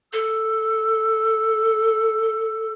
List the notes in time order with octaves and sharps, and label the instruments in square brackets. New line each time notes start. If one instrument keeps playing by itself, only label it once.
[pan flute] A4 [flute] E6